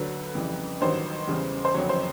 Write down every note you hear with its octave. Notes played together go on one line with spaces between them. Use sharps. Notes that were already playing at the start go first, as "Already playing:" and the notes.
Already playing: D2 D3 F#3 B4
F2 C#3 E3 G3
A1 G2 D#3 F#3 C5
E2 C#3 E3 G3
C5
F#1 F2 D3 F#3 C#5
C5